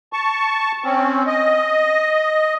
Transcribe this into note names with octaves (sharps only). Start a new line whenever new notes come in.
A5 C#6
C4 C#4
D#5